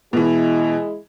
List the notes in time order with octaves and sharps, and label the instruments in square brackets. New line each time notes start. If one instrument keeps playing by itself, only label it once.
[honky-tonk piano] B2 E3 [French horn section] G#3 E4 G#4